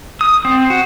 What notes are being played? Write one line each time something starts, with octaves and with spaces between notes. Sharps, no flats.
D#6
C4
F#4